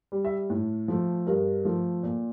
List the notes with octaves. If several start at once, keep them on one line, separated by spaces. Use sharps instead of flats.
G3
E5
A2
F3 A3
G2 A#4
F3 A3
A#2